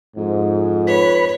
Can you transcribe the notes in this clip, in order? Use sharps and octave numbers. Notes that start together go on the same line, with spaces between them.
F2 G#2
B4 C#5 B5